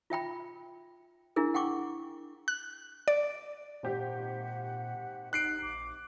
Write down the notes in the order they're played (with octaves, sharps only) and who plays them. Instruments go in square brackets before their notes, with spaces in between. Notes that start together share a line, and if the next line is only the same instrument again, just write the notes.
[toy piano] F4 E5 G5 B5
D4 E4 G#4 A#4
F#5 G5 C#6 D6
[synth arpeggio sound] F#6
D5
[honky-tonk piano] G#1 G4 [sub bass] A#2 [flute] F#5
[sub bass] D#1 [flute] D#4 [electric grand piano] F#6 C7 D7
[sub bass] A#1 [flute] D6